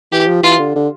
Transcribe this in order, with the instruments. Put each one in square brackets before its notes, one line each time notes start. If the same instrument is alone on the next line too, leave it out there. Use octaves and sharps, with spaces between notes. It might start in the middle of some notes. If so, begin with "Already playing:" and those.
[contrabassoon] E3 [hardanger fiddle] G4
[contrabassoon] F3
[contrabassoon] E3 [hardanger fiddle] F4
[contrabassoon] D3
D3